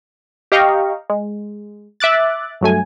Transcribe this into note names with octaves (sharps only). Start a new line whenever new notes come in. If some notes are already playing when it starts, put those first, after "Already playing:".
G4 D#5 F5 G5 A#5 C#6
G#3
E5 D6 F#6 A6
G2 F#3 A3 G#5